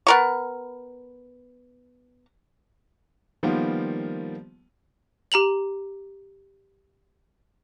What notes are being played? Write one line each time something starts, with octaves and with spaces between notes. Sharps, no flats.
B3 A#4 C#6
D#3 F3 G3 A#3 B3 F4
G4 A#5 F7 F#7